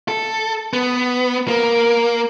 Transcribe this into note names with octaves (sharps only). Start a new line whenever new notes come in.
A4
B3
A#3